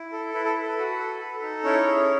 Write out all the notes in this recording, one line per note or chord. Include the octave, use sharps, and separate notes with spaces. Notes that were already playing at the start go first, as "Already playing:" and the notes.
Already playing: E4
A4
E4 B4
A4
A4
B4
F#4
A4
A4
D#4
C#4 E4 C#5
G#4